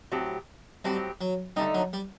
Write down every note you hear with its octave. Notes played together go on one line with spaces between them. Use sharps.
A2 F#3 C4 G4
A2 F#3 G3 C4 G4
F#3
D3 G3 A3 D#4
F#3
G3